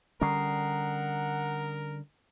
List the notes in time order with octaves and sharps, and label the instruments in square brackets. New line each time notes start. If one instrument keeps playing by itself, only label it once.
[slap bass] D3 G3 C#4 [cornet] A#4 [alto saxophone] F#5 [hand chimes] A#5 D#6 C7